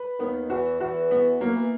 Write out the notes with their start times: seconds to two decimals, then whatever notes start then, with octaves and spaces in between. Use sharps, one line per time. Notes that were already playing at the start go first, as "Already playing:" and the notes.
Already playing: B4
0.20 D#2 D#3 B3
0.50 E2 E3 F#4
0.80 E2 E3 F#4
1.11 B3
1.40 F#2 F#3 A#3
1.56 E3